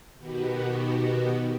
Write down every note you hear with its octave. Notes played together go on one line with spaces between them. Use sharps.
B2 D#3 B3 F#4 G4